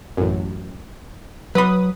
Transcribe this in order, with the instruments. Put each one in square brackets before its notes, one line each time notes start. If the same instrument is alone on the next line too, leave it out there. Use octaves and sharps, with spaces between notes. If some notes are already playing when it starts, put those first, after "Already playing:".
[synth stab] A1 F#2
[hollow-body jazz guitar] F#3 B5 [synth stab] B4 D#6